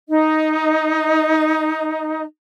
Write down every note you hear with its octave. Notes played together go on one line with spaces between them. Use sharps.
D#4 D#5